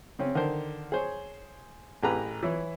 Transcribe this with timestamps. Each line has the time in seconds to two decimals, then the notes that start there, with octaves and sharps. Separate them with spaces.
0.19 C#3 C4 C#4
0.35 D3 D#3 A#4 C5
0.92 G#4 C5 C#5
2.03 A1 G4 G#4 B4 A#5
2.43 E3 E4 C#5